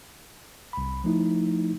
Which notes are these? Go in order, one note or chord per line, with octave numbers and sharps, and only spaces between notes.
C2 B5
F3 A3 D#4 E4